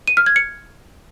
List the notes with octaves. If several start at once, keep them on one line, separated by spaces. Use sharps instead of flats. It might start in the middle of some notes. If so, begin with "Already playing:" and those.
D#7
F6
G#6
C#7